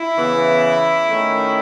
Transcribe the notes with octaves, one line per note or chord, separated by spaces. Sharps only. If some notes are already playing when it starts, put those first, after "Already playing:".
Already playing: E4
C#3 E3 B3
D#3 A3 C#4